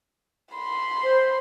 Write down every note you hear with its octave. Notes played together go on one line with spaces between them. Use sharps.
B5 C6
C5